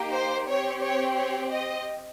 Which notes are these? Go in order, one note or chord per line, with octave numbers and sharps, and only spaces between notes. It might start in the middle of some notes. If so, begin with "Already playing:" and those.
Already playing: A#3 D#4 G4
C5
C4 G4 C#5
C#5
C#5
D#5